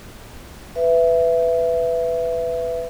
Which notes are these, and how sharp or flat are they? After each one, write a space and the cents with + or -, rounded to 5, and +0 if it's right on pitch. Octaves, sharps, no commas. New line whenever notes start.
B4 +10 E5 +15